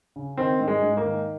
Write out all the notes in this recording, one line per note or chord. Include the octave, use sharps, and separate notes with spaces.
C#3
D#3 C4
G#2
G#3
G#2
A#3
D#3